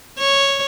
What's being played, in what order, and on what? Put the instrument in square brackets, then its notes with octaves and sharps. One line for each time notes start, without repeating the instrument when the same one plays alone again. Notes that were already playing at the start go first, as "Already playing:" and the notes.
[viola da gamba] C#5